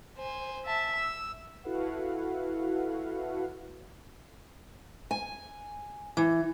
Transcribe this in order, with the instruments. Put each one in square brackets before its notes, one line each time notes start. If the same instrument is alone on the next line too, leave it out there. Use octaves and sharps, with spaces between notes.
[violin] C5 G#5
E5 A5
E6
[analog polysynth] E4 F#4 A4 B4 F5 F#5
[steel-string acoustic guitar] G#5
E3